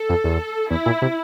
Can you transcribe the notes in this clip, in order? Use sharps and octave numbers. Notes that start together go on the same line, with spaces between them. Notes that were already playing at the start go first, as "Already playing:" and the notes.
Already playing: A4
F2
E2
E2 E4
A#2
C3